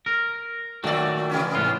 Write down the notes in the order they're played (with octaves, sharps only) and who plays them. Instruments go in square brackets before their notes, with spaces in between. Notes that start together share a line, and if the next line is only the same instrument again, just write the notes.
[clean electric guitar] A#4
[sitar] A2 D5 [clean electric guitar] D#3 F#3 A3
[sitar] C3 E3 C#4
[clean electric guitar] A2 B3 F4